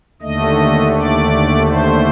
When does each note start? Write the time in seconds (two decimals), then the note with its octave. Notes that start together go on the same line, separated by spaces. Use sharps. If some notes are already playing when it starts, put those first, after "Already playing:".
0.22 D#2 D3 A3 D#5
0.96 D5
1.69 C5